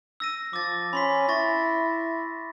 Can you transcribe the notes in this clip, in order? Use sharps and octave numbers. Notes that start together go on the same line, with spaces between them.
E6 A#6 D#7
F3 D6 A6
C#4 B5 C6 B6
E4 C#6 A6 A#6